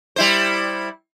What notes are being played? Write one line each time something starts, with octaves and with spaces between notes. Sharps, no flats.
G3 E4 C5